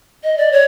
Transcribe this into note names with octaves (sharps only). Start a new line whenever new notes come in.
D#5
D5
C#5